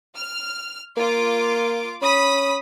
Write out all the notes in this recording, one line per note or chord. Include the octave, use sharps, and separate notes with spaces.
F6
A#3 F4 D6
C#4 B5 D#6 B6